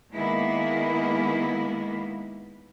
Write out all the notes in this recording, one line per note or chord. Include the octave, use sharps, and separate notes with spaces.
D#3 G#3 A#3 B3 E4